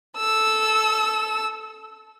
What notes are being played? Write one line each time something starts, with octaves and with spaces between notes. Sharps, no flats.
A4 E6